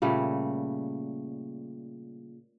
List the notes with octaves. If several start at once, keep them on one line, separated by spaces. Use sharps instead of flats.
A#2 C#3 G3 A3